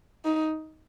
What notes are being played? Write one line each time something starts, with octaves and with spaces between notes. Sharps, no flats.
D#4